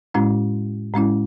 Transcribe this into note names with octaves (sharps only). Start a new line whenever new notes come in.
A2 G#3 C#4 E4
A2 G#3 C#4 E4